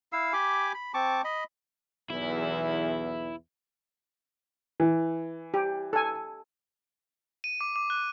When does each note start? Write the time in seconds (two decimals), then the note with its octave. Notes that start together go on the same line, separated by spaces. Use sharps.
0.13 E4 F5 E6
0.33 G4 G#5 B5 D6
0.74 B5
0.94 C4 A5 C#6 D6
1.24 D#5 B5
2.10 B1 E2 E4
4.80 E3
5.54 G4
5.93 A4 G#5
7.44 D#7
7.61 D6
7.76 D6
7.90 F#6